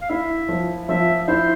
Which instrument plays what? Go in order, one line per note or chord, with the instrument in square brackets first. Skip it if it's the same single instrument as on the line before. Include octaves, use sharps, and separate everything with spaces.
[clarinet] F5
[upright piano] E4 [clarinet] E5
[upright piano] F3
[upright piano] F3 [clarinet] E5
[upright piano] E4 [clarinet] C5